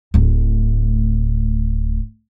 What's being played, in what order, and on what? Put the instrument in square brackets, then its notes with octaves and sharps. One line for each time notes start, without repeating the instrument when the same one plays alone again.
[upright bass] D1 A2